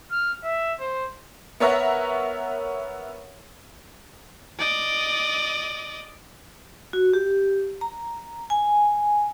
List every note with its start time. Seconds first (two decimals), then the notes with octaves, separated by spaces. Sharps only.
0.11 F6
0.44 E5
0.80 C5
1.60 B3 A#4 C#5 E5 F#5 A#5
4.59 D5 D#5
6.93 F#4
7.14 G4
7.81 A#5
8.50 G#5